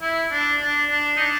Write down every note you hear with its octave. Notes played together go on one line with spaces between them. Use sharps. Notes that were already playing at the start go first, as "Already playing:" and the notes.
E4
D4
D4
D4
D#4
D4